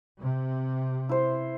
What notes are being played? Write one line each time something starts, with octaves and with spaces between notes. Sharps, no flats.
C3
E4 C5